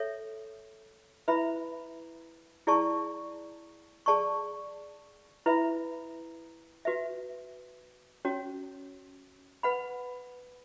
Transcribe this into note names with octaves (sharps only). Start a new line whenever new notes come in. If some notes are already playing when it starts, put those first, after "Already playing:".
Already playing: A4 C#5 E5
E4 B4 E5 B5
E4 G#4 D5 A5 C#6
G#4 D5 A5 C#6
E4 B4 E5 B5
F#4 B4 E5
C#4 F#4 C#5
B4 F#5 B5